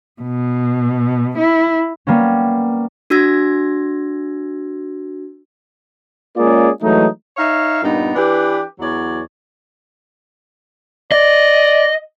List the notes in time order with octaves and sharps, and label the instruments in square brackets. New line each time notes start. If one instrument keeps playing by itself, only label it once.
[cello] B2
E4
[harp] G3 A#3 B3 C#4
[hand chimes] D4 F#4 E6 G#6 A#6
[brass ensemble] G#3 A#3 C#4 F4 G#4 D5
E3 F#3 G#3 A3 D#4
[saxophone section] D#4 C#5 E5 F5
G2 A#2 B3 D#4
E3 D4 G4 B4
E2 F#3 C#5 D5
[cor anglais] D5 [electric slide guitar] D#5